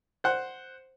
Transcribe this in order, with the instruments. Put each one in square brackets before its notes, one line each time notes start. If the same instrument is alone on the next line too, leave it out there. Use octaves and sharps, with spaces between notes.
[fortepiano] C5 F#5